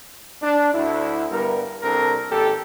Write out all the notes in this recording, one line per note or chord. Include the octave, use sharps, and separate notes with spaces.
D4
D2 E4
G2 G3 B3 A#4
C2 C4 D4 A4 A#4
G#1 A#2 G4 A4